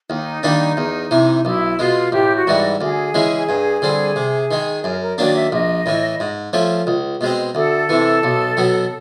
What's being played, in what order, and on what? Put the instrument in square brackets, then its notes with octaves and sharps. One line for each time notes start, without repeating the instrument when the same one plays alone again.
[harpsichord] D#2 [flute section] D#4
[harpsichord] D#3 G3 A#3 D4
E2
C3 E3
[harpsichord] B1 [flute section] E4
[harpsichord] B2 G#3 [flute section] F4
[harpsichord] A1 [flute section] G4
[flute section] F#4
[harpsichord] G#2 E3 G3
[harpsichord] D2 [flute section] G#4
[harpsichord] C#3 E3 G#3 C#4
G2
D3 G3 C4
C3
D#3 G#3
[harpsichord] F#2 [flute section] A#4
[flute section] A#4
[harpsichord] D#3 F#3 A#3 D4 [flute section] D5
[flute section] E5
[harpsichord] A#1 [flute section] D#5
[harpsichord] A2 E3
G#2
F3 A3 C#4
C#2
B2 G#3 C4
[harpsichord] D2 [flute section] A4
[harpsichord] C3 E3
B1
B2 F#3 B3